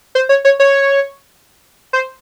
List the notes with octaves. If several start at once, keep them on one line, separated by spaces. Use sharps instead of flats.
C5
C#5
C#5
C#5
C5